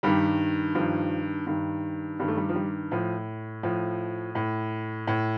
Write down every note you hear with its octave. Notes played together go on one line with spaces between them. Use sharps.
G2 D#3 G3
G2 D#3 F3
G2 D#3
G2 D#3 G3
A3
G3
F3
G3
A2 F3
A2 F3
A2
A2